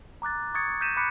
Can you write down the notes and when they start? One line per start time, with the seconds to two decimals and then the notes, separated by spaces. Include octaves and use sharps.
0.22 A#5 D6 F#6 A6
0.54 C#6 D#6 G#6 A6 C#7
0.81 E6 G6 A#6 B6 D#7 E7
0.97 B5 D6 F#6 B6 C#7